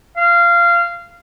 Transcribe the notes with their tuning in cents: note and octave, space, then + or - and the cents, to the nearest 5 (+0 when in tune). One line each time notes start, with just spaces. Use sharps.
F5 -20